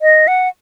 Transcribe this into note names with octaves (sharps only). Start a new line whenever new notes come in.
D#5
F#5